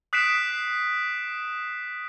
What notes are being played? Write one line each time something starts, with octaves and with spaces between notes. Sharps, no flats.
D#6 F#6 B6 C7 D7 E7